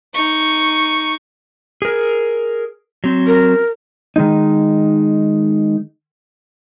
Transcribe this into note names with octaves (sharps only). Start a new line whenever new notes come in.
D#4 C#6
G#4 A#4
F#3 C4
A#4
D#3 G#3 D#4